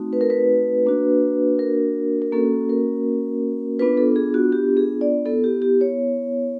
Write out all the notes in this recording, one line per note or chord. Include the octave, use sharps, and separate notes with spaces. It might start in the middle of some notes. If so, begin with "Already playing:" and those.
Already playing: A3 C4 D#4 F#4
B4
A#4
B4
A#3 D4 F#4
A#4
A#4
A#3 C#4 F#4 A4
A#4
B3 D4 F4 B4
A4
G#4
F#4
G4
G#4
D5
B3 E4 A4
G4
G4
C#5